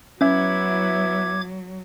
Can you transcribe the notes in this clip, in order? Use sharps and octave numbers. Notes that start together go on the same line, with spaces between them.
F#3 B3 C#4 E4 E5 D6 G#6